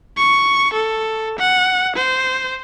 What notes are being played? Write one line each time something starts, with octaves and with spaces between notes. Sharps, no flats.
C#6
A4
F#5
C5